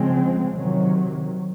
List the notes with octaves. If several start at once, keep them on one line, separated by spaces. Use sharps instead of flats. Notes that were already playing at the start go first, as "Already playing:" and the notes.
Already playing: C#3 F3 G#3 C4
C3 D#3 F#3